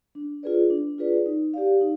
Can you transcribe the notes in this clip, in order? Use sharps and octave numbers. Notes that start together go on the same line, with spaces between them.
D4
F4 G#4 B4 D5
D4
F4 G#4 B4 D5
D#4
G4 D5 F5
D#4